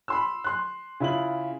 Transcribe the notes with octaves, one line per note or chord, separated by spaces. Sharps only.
B5 C6 E6
C6 F#6
C#3 E4 F4 F#7